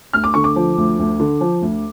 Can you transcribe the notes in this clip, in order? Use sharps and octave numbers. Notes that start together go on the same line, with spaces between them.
D2 F6
D6
D3 C#6
D6
F3
D2
D2
D3
F3
D2